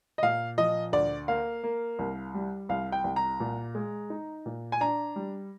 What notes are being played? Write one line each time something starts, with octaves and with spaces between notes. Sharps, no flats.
D#5
A#2 F5
F3 D#5
D2 D5
A#3 F5
A#3
C2
G3
C2 F5
G5
C2
A#5
A#2
G#3
D#4
A#2
G#5
D4 A#5
G3